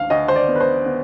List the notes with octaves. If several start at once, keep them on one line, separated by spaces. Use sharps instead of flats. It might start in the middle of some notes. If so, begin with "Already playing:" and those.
Already playing: D2 F5
D2 D#5
C5
D5
B3
B4
C5
B3